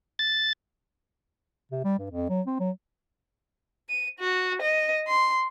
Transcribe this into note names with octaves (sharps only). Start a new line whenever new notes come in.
A6
C3
G3
G2
F2
F#3
C4
F#3
D#7
F#4
D#5
C6